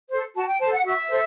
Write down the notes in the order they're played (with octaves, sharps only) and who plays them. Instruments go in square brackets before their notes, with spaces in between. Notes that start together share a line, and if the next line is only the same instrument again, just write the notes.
[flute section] A4 C5
F#4 A5
G5
A4 C5 A5
F#5
F#4 E5
A4 C5